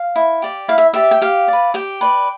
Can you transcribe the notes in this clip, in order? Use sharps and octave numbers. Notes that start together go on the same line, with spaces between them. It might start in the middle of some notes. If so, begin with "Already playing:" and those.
Already playing: F5
E4
G4 D5
E4 F5
E5
G4 D5 E5
G5
G4 F5
B4 D5
G4 G5
B4 D5